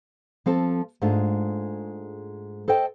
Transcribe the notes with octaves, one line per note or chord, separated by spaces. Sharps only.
F3 C4 A4
G#2 G#3 A3 D4 F4
A4 C5 D#5 G5